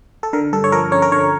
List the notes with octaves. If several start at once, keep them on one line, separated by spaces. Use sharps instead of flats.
A4
D3 A#4
G2 A4
C#5
F3 A#4
C#4 C#5
A#4
D3 C#5